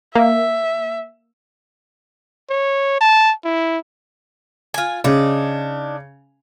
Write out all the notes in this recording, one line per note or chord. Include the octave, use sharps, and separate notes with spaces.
A#3 E5
C#5
A5
E4
F4 G#5
C#3 D4 D#4